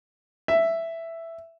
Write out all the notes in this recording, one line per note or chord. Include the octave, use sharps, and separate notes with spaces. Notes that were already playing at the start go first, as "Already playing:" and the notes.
E5